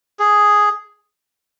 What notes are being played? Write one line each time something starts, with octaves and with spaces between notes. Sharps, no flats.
G#4